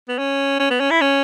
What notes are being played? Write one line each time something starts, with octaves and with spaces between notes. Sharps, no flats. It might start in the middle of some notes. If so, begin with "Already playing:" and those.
B3
C#4
C#4
B3
C#4
E4
C#4